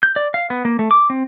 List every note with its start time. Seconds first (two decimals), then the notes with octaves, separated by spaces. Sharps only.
0.03 G6
0.16 D5
0.34 F5
0.50 B3
0.65 A#3
0.79 A3
0.91 D6
1.10 C4